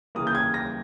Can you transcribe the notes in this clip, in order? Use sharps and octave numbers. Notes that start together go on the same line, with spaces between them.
C#3 E3 A#3 D#6
G6
G#6
A#6